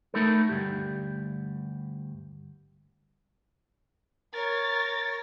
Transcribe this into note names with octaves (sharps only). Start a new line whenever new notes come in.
A3 D#4 E4 A4 A#4
D2 G2 G4
A#4 C#5 A6